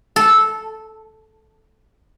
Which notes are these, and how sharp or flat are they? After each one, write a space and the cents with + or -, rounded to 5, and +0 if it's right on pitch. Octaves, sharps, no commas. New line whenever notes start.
A4 -10